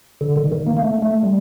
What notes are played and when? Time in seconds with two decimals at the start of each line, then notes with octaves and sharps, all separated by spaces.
0.21 D3
0.36 D#3
0.44 D3
0.52 D#3
0.67 A#3
0.77 A#3
0.82 A3
1.02 A3
1.23 G3